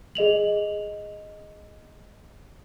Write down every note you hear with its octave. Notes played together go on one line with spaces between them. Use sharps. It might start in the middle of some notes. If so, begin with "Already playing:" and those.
G#4 D#5 F7 F#7